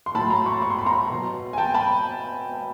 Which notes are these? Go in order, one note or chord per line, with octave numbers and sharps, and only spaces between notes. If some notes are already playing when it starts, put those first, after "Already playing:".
C6
A2 F#3 A5 B5
A#5 C6
B5 C#6
C#6
C6
B5
A#5 C6
B2 F#3
G#5
G5 A5
A5 B5